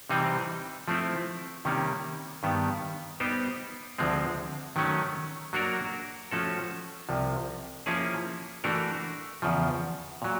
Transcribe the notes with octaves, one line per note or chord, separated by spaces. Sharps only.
C3 E3 G3 C4 D#4
F3 A3 C4 E4
C3 D#3 G3 A#3 C#4
G2 D#3 G3 B3
G3 B3 D#4 G4 C5
D2 D3 F3 G#3 C4
D#3 F#3 A3 C#4
F#3 A#3 D4 F#4 A#4
F3 A3 C#4 F#4 A4
C2 C3 F3
F3 A#3 C#4 E4 G#4
E3 A3 D4 F#4 A#4
E2 C#3 F3
A#2 F#3